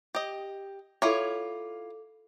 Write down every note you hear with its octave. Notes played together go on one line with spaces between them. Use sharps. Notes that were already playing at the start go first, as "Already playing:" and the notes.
G4 D#5
E4 F4 A4 C#5 D6